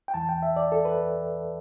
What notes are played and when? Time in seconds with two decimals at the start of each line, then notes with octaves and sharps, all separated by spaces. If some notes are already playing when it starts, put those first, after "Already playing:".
0.08 G5
0.14 E2 E3 A5
0.29 G5
0.43 E5
0.56 D5
0.72 A4
0.85 B4